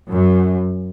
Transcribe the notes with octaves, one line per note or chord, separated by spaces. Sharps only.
F#2